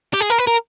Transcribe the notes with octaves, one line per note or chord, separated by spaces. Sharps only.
G4
G#4
A#4
B4
A#4